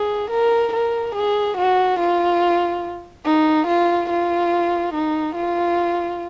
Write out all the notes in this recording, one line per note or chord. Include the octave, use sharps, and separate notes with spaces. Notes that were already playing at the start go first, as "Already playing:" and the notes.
Already playing: G#4
A#4
A#4
G#4
F#4
F4
D#4
F4
F4
D#4
F4